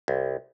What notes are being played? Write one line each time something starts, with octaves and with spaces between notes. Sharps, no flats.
C2